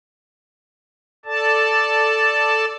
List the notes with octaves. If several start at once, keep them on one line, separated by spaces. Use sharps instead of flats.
A4 D5 A5